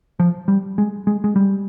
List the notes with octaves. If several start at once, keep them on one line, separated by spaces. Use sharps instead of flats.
F3
G3
G#3
G#3
G#3
G3